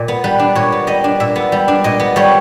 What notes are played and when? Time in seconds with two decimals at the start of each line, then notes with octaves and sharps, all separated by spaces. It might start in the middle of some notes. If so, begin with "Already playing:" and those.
Already playing: A#2
0.08 B3
0.24 G3 B4
0.39 D4
0.55 A#2 C#5
0.72 B3
0.87 G3 D#5
1.04 D4
1.20 A#2 E5
1.36 B3
1.52 G3
1.68 D4
1.84 A#2 D#5
2.00 B3
2.16 G3 C#5